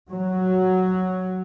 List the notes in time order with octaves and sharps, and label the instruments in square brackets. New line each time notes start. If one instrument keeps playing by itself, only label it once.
[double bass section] F#3